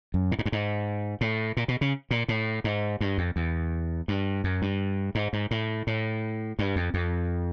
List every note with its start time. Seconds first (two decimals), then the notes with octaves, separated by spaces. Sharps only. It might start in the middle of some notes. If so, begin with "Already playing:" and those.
0.14 F#2
0.32 A2
0.39 G#2
0.45 G2
0.52 G#2
1.21 A2
1.57 A#2
1.68 B2
1.81 C#3
2.11 A#2
2.28 A2
2.64 G#2
3.01 G2
3.18 F2
3.36 E2
4.08 G2
4.44 F#2
4.62 G2
5.15 G#2
5.33 G#2
5.51 A2
5.87 A2
6.59 G2
6.76 F2
6.94 F2